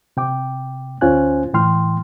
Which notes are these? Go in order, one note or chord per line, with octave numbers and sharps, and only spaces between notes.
C3 G5 D6
D2 C#4 F4 C5 G#5 F#6
A2 E3 G5 C6 F6